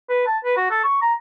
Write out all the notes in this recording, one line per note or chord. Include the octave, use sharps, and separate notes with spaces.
B4
A5
B4
F#4
A4
C#6
A#5